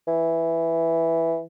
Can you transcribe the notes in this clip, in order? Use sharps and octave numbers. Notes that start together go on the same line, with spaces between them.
E3